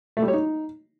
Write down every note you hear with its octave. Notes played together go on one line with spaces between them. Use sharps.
A3
G3
C#5
D#4